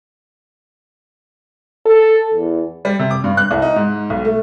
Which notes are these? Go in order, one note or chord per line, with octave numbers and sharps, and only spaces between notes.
A4
E2
G3
C3
D6
G2
F#6
C2
D#4
G#2
B1
A3